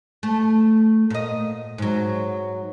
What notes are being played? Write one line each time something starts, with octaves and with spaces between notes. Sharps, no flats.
A3
A#2 D#5
G#2 F#3